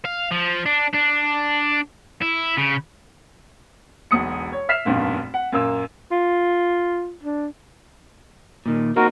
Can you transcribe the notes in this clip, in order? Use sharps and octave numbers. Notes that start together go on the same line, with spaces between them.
F5
F3
D4
D4
E4
C#3
E1 B1 D#6 C#7
C#5
E5 F6 B6 C7 E7
F1 B1 G2 A#2 C#3
F#5
F#2 A#2 A#3 E6
F4
D4
A#2 D#3
A#3 C4 D#4 F#4 A#4